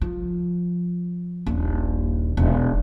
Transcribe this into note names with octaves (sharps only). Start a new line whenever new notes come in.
F3
D#1 A#1
E1